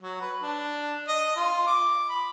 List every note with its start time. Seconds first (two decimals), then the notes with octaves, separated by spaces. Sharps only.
0.01 F#3
0.21 B4
0.42 D4
1.08 D#5
1.36 F4
1.67 D6
2.09 B5